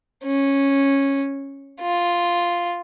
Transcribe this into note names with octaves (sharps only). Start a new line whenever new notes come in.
C#4
F4